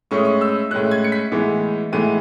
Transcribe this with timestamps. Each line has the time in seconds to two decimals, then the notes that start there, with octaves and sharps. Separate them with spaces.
0.11 A2 G#3 C#4 C#6
0.18 D#6
0.25 C#6
0.41 E6
0.71 A2 G#3 C#4 F#6
0.91 G#6
1.04 C#7
1.12 B6
1.32 A2 E3 G#3 B3
1.93 A2 E3 G#3 B3 D#7